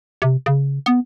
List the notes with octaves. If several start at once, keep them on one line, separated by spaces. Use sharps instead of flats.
C3
C#3
B3